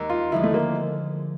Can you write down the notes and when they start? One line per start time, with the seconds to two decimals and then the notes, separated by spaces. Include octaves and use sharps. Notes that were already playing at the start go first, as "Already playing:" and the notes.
Already playing: D#2 G#3
0.10 F4
0.32 D3 F3 G#3 E4
0.43 A3
0.54 A#3